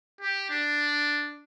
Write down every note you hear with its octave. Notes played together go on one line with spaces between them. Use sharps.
G4
D4